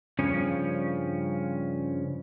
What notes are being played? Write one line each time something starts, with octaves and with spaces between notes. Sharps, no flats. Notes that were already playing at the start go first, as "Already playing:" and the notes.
G2 C#3 F3 C#4